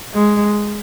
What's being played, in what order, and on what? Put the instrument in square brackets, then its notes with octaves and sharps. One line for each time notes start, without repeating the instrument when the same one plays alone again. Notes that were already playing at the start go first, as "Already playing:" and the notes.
[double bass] G#3